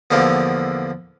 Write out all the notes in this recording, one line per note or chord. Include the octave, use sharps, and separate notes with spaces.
E2 D3 F3 A#3 G4